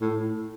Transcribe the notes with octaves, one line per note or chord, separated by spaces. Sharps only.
A2